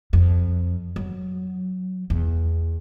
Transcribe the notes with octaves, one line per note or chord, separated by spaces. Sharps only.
F2
F#3
E2